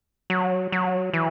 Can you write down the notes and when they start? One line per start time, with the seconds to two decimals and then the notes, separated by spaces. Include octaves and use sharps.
0.30 F#3
0.72 F#3
1.13 E3